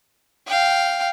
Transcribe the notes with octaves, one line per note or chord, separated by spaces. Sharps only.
F5 G5